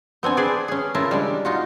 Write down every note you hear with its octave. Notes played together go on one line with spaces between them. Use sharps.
B3 C4 D4 G#5
G#4 B4 C5 D5 G#5
C#4 G#4
C#3 E4 F4 A#4 A5
G3 G#3 D4
D#4 F4 F#4